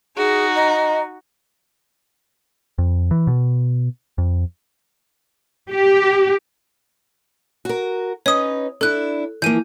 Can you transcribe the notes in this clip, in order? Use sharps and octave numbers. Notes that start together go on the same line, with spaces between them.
D#4 F#4 G#4
D#5 A#5
F2
E3
B2
F2
G4
F#4 A#4
C#4 D#4 B4 C#5 D#6
D4 E4 A4 F#6
E3 F3 A#3 G6 D#7